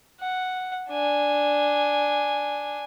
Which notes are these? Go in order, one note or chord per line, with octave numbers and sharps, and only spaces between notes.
F#5
D4 G#5